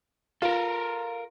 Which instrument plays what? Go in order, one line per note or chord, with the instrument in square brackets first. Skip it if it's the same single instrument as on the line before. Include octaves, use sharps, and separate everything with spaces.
[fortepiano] F4 [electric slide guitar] A4 A#4